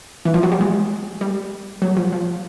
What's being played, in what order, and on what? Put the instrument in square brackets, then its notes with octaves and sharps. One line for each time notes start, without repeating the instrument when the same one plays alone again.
[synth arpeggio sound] E3
F3
F#3
G3
G#3
G3
F#3
F3
F3